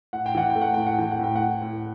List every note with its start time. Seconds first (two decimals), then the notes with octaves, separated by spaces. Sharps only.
0.13 A2 F#5
0.26 G5
0.35 E3 F#5
0.50 G5
0.55 A3
0.62 F#5
0.74 A2 G5
0.87 F#5
0.98 E3 G5
1.11 F#5
1.19 A2 G5
1.36 A2 F#5
1.62 A2